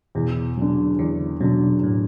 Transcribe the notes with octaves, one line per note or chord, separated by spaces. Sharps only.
E2 B2
D3 F#3
E2 D3
B2 D3 F#3
A2